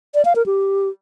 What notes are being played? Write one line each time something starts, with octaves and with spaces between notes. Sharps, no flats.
D5
F5
A#4
G4